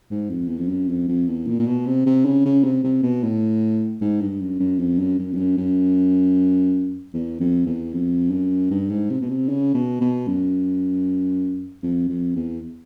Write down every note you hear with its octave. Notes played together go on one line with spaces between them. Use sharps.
G#2
F2
E2
F2
F#2
F2
F2
E2
A#2
A#2
B2
C3
C3
C#3
C#3
C3
C3
B2
A2
G#2
G2
F#2
F#2
F2
F#2
F#2
F2
F#2
F#2
E2
F2
E2
F2
F#2
G2
G#2
C3
B2
C3
C#3
B2
B2
F#2
F2
F2
E2